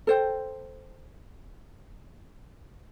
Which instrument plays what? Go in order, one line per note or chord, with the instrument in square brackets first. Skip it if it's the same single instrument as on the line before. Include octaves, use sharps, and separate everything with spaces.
[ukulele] A4 C5 G5